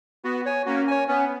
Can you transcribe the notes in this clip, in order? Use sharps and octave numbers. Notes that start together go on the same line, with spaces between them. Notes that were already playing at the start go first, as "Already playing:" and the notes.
B3 F#4
C#5 G#5
A#3 C#4 F#4
C#5 G#5
B3 C#4